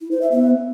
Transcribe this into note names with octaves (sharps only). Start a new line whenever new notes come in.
E4
C5
E5
B3